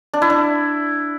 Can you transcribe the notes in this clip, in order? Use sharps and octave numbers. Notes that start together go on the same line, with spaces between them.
D4
E4
D4